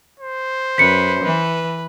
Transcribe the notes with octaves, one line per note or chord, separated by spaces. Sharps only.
C5
F#2 B4 B6 C#7
E3 B4